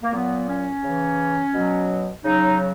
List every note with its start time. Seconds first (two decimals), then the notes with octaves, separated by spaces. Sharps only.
0.03 A#3
0.13 A#2 F#3 B3
0.49 C#4
0.83 C#3 E3
1.54 B2 F#3
2.24 C#3 F#3 D#4